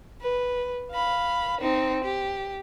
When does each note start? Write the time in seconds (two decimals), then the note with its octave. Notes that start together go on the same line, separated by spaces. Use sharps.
0.21 B4
0.92 F5 B5
1.61 C4 D#4
2.04 G4